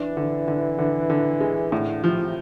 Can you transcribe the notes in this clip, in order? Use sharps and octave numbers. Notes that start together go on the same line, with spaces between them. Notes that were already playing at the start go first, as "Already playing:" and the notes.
Already playing: E3 D4
D3
D3
D3
D3
G#3
A2 D3
C3 F3